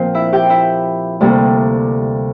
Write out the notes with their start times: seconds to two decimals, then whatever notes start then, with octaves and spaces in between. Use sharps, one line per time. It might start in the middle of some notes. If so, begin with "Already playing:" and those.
Already playing: A#2 F3 C4 C5
0.14 E4 E5
0.33 G4 G5
0.50 E4 E5
1.20 D2 C3 G3 A#3